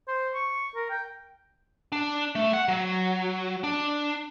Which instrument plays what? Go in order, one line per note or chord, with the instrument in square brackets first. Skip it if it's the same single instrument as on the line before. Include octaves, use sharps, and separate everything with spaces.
[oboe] C5
C#6
A#4
G5
[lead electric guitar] D4
A3
F#5
F#3
D4